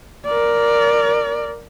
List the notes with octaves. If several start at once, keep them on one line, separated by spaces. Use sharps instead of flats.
A#4 D5